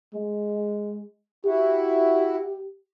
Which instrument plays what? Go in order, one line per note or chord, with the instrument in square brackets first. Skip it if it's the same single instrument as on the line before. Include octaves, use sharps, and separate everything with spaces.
[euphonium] G#3
[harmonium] E4 F#4 [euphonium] G4